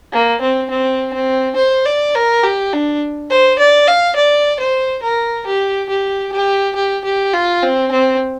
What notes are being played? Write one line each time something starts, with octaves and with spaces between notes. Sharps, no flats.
A#3
C4
C4
C4
C5
D5
A#4
G4
D4
C5
D5
F5
D5
C5
A#4
G4
G4
G4
G4
G4
F4
C4
C4